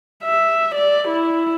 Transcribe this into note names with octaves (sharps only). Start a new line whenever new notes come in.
E5
D5
E4